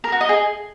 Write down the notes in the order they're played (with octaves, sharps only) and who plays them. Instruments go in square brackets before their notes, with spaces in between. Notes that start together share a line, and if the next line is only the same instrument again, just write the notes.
[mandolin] A#4
F#4
D#5
G#4